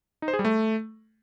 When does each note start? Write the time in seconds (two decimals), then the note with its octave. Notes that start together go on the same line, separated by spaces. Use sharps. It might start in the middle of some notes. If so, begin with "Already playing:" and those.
0.22 D#4
0.28 C5
0.33 G#4
0.39 G3
0.45 A3